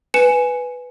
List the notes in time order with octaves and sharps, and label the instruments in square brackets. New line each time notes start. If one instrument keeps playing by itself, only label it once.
[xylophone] B4 G#5 C#7 E7